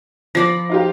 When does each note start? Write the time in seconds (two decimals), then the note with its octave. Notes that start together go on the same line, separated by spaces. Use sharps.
0.35 F3 D5 B5 A#6 C7
0.69 D#4 F4 G4